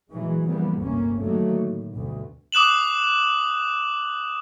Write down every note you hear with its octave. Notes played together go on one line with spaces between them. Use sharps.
A#2 E3 F#3 G#3
C#3 E3 F3 G3 A#3 B3
G1 D2 G2 C3 A#3 C#4
A#2 D3 D#3 F#3 A3 A#3
A2
D2 G2 B2
D6 D#6 F#6 E7 F#7